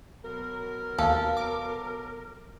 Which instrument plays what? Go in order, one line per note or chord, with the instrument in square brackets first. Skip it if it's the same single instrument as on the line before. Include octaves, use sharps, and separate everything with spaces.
[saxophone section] B2 F#3 A#4
[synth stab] D#2 [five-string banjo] A4 [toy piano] F5
[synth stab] D6